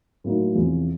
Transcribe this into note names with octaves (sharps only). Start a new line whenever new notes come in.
A2 F#3 A#3 D#4
E2 C3 F3